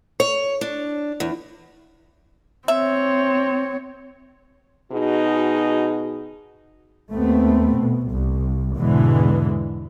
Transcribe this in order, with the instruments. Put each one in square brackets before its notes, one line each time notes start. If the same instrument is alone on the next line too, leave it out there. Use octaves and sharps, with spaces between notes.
[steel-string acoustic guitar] C#5
D4
E2
[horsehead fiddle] C4 C#5 [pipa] E5
[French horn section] B2 D#4 F#4 G#4
[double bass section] D#2 A3 B3 C4
B2
C2
E2 G#2 B2 D3 E3 G#3